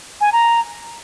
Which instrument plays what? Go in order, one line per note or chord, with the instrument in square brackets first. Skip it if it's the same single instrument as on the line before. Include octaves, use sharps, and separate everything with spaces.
[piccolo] G#5
A#5